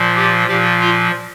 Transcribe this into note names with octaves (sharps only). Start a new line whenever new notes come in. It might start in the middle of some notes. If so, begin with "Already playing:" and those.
Already playing: A#2 F3
G4
A#2 F3 G4
F4